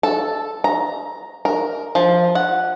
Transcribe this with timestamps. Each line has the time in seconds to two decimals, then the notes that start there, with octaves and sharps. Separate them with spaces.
0.03 A4
0.64 A#5
1.45 A#4
1.95 F3
2.35 F#5